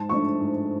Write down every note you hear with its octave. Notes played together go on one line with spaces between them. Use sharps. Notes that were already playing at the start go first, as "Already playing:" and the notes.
Already playing: G#2 A5
F3 A3 D4 C#6
G#2